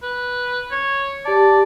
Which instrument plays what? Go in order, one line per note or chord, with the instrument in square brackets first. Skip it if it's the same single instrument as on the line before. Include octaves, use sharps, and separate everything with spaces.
[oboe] B4
C#5
[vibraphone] G4 A5 [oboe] D5